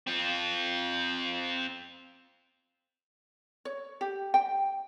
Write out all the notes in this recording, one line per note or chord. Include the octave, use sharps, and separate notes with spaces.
C4 F4
C#5
G4
G5